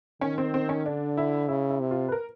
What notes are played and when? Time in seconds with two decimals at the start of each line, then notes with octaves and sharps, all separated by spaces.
0.21 D#3 C#4
0.38 C4
0.54 C4
0.69 C#4
0.86 D3 D4
1.17 E4
1.48 C#3 E4
1.70 E4
1.80 C3
1.91 F4
2.08 B4
2.12 A#4